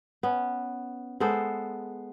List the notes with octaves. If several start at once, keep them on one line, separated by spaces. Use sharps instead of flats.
B3 C#4
G#3 B3 A4 C5